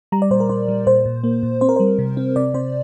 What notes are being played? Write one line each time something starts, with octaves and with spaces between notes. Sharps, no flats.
G3 A#5
D5
A#2 C5
A#4
A#2 C5
G3
A#2 C5
A#2
A#3
A#2
C4 C5
A#4
G3 C5
C3
C4
C3 D5
C3 C5